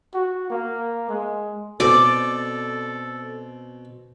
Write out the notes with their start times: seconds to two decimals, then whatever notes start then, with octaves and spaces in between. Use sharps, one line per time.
0.14 F#4
0.50 A#3
1.09 G#3
1.80 B2 C4 A4 D5